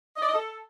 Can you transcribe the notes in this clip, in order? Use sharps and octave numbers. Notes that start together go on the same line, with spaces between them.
D#5
D5
D#5
A4